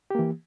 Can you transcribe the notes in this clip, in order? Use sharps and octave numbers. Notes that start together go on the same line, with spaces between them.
E3 A#3 G4